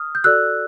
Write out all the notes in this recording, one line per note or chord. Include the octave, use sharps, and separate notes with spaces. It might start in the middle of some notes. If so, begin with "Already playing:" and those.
Already playing: D#6 F6
G6
F#4 A4 D5 E6 F#6